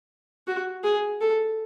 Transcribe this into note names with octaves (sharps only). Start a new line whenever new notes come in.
F#4
G#4
A4